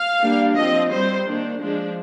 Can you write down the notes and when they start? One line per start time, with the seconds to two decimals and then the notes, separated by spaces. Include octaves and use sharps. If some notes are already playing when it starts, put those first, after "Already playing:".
Already playing: F5
0.22 G3 A#3 D4
0.56 F3 C4 D#5
0.92 G3 C4 C5
1.27 D#3 A#3 D4
1.60 F3 G#3 D4